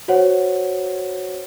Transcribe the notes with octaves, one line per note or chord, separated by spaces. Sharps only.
F#4 C5 C#5 F#5